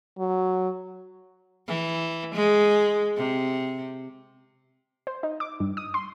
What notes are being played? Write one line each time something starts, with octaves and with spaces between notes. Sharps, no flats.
F#3
E3
G#3
C3
C5
D#4
D6
G2
D#6
C6